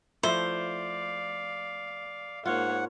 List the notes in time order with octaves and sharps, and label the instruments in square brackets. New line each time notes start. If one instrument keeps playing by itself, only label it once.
[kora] F3 A3 E4 [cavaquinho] C5 [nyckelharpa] D5 F5
[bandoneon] G#2 F#5 [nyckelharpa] A#3 C#5 [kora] F4